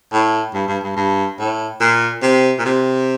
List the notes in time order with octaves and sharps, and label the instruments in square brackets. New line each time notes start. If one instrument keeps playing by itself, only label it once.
[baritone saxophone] A2
G2
G2
G2
G2
A2
A#2
C3
A#2
C3